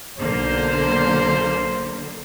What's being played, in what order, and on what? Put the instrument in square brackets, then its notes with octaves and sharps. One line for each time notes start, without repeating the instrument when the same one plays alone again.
[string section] B1 D3 A#3 [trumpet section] C5